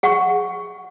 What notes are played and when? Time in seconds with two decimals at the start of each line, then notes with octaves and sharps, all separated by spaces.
0.03 G#4 F#5 C#6